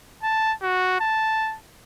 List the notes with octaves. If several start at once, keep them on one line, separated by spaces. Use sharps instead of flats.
A5
F#4
A5